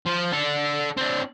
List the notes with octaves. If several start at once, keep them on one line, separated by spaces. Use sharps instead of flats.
F3
D4 A4
C4 D4